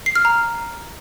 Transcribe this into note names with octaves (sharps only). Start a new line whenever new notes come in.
C7
F6
A#5